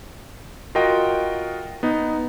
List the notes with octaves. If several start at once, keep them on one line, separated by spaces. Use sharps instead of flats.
F4 F#4 A#4 D#5 G5
B3 D#4